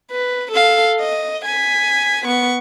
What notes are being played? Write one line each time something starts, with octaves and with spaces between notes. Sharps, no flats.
B4
A4 F5
D#5
G#5 B6
B3 C#6